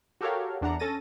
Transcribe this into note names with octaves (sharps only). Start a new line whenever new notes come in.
F#4 G4 A4 A#4 C#5 F5
E2 D4 F#5 A#5
C#4 A4 A6 A#6 D#7